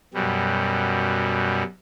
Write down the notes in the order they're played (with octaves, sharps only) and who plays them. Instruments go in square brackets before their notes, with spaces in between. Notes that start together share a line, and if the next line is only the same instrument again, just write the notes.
[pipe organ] F#2 B2 G3